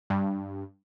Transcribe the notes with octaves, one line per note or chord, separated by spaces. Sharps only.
G2